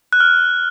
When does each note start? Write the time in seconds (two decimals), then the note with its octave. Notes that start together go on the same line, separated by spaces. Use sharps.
0.13 F#6
0.20 F6